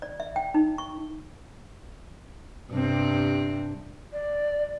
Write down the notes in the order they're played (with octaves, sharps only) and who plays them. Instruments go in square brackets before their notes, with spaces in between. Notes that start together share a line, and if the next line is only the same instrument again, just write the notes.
[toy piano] D5
E5
G5
D#4
C#6
[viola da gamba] G2 C3 C4
[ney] D5